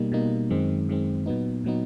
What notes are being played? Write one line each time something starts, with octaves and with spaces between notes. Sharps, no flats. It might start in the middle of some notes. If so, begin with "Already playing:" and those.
Already playing: B2 G3 A#3 D#4
B2 G3 A#3 D#4
F#2 D#3 G#3 C4
F#2 D#3 G#3 C4
A#2 F#3 B3 D#4
A#2 F#3 B3 D#4